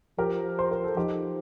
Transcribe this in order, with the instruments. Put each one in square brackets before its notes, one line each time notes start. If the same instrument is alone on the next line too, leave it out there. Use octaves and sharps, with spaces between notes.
[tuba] F3 [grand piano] G4 A#4
[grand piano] C5
A#4
A4
[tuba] F3 [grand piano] D#4 G4